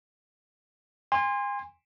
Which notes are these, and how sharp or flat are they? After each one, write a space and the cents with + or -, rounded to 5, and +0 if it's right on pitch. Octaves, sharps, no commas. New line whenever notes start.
G#5 -35 C6 +0